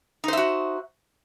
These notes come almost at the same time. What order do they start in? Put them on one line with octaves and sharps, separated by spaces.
D#4 C5 E5 F#4